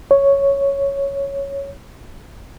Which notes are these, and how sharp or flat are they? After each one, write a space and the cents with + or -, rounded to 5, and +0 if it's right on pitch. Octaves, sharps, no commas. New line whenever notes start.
C#5 +0